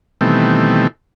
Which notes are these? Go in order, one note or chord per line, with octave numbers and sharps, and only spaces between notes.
B2 D#3 E3 G3 A3 C4